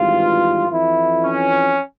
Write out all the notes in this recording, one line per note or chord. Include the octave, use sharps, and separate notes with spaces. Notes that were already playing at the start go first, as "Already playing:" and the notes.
Already playing: G#1 G2 E3 F4
F2 E3 E4
C#4